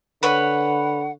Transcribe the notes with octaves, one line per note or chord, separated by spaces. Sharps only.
D3 B4 C#5 F#5